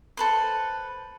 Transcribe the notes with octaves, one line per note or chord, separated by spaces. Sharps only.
A4 B4 C5